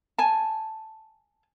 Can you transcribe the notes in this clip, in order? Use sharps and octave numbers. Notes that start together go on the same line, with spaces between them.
G#5 A5